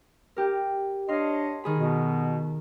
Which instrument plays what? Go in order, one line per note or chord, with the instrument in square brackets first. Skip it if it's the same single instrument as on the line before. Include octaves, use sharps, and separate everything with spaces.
[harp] G4 A#4
[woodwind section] D4 C#5 D#5 [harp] F5 C6
[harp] D#3 G#4 B5
[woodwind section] B2 B3